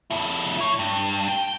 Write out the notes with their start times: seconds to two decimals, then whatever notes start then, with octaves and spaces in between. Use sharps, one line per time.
0.11 F2 E4
0.59 E4 C#5
0.79 G2
1.29 G5